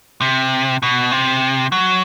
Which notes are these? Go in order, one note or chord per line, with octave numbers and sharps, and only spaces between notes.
C3
B2
C3
F#3